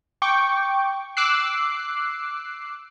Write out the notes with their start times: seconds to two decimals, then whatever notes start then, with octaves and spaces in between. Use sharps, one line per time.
0.22 G5 C#6 D6
1.17 D6 E6 F#6 C7